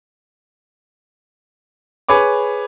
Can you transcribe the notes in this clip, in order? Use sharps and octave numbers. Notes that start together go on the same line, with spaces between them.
G#4 B4 C#5 B5 D6